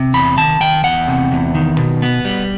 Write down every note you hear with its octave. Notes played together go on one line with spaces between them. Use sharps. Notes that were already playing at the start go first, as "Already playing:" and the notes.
Already playing: C3
E2 B5
D#3 A5
D#3 G5
E2 F#5
C3
E2
D#3
B2
B3
G3